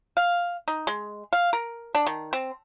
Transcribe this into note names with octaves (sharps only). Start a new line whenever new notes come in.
F5
D#4
G#3
F5
A#4
D4
D#3
C4